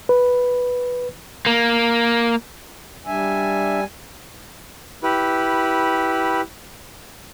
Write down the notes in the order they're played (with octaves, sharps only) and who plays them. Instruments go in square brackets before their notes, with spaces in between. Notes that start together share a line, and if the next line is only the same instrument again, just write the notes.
[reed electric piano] B4
[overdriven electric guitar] A#3
[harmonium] G3 G#5 [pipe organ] D4 E5
[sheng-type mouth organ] E4 G4 B4